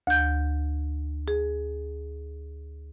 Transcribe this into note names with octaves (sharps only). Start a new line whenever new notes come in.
D2 G6
G#4